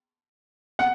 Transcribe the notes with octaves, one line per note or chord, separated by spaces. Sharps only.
F#5